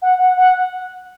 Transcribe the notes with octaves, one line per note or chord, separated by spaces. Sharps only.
F#5
F#5
F#5